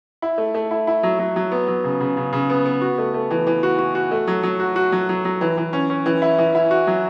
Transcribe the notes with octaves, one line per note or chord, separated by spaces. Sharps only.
E4
A3
A3
E4
E4
F#3
F#3
F#3
B3
F#3
C#3
C#3
C#3
C#3
B3
B3
F#4
A3
A3
E3
E3
F#4
F#4
F#4
A3
F#3
F#3
F#4
F#4
F#3
F#3
F#3
E3
E3
C#4
C#4
E3
E4
E3
E4
F#4
F#3